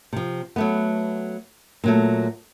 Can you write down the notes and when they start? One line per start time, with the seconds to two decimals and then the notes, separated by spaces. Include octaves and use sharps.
0.13 C3 F3
0.56 F#3 A3 B3
1.84 A#2 F#3 A3